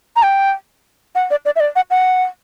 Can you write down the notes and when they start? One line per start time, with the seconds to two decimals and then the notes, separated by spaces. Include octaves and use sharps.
0.16 A#5
0.23 G5
1.15 F#5
1.31 D5
1.45 D5
1.56 E5
1.60 D5
1.76 F#5
1.91 F#5